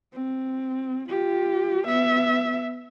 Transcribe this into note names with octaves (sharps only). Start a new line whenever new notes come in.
C4
F4 G4
B3 E5